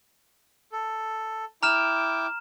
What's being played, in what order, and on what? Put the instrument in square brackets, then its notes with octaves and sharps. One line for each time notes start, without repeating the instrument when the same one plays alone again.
[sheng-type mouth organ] A4
[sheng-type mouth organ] E4 G5 D6 [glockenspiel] A#5 F6 E7